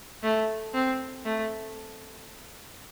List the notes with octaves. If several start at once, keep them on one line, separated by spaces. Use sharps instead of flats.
A3
C4
A3